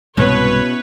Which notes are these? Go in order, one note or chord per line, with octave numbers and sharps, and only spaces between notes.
C2 G#2 B2 B3 C#4 E4 B4 C#5